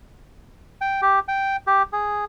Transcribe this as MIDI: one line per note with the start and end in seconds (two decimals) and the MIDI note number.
0.81 1.01 79
1.02 1.19 67
1.28 1.56 79
1.67 1.83 67
1.93 2.25 68